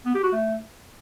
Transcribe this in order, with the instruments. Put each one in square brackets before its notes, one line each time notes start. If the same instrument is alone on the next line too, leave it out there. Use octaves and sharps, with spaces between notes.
[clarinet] B3
G4
F#4
A3